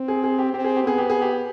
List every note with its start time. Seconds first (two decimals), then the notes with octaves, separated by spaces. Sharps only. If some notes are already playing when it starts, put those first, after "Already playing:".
Already playing: C4
0.08 G#4
0.24 G#4
0.39 G4
0.54 C4 G4
0.64 G#4
0.76 G4
0.84 B3 G#4
0.98 G4
1.10 G#4
1.22 G4